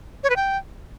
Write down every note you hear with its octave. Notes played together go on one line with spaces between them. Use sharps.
C#5
B4
G5